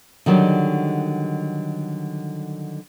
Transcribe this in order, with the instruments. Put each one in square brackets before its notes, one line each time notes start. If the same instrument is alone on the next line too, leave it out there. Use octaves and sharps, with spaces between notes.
[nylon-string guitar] D3 D#3 F#3 G3 D#4